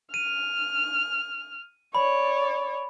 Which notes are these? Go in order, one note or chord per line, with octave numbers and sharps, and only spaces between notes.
F6 D#7
C#5 D5 B5